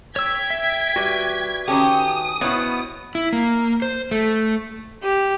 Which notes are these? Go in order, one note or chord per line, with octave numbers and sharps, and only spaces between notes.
C#5 G5 E6 G#6 B6
E5
G3 F#4 B4 E5
D#3 C#4 G4 A4 D#6
B2 B3 E4 C5 C#5
E4
A#3
C5
A3
G4